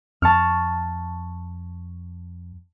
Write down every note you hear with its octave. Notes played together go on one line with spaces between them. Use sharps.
F2 A5 C#6 F6